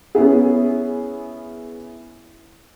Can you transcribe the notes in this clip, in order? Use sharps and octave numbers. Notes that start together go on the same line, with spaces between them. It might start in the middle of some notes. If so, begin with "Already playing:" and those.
B3 C#4 E4 G#4